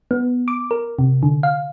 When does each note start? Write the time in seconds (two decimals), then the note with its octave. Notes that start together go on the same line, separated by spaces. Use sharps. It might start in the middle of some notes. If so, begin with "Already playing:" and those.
0.11 B3
0.48 D6
0.71 A#4
0.99 C3
1.23 D3
1.43 F5